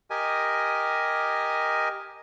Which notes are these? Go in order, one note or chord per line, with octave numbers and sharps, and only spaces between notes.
G4 A#4 D#5 G#5